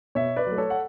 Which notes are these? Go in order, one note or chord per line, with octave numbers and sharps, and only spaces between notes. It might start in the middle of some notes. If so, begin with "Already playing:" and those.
B2 C#5 E5
B4 D5
F#3
A3
A4 C#5
F#5